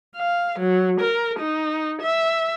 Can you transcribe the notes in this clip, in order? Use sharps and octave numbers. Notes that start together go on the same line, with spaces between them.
F5
F#3
A#4
D#4
E5